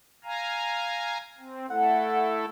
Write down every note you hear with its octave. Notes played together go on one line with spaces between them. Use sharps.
F5 G#5 A#5
C4
A3 E4 A4 F#5